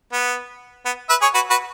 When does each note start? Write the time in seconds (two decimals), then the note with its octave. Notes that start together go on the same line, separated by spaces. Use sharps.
0.13 B3
0.86 B3
1.10 B4 E5
1.21 G#4 C#5
1.34 F#4 B4
1.50 F#4 B4